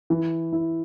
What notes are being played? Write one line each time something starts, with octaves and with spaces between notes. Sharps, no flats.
E3
E4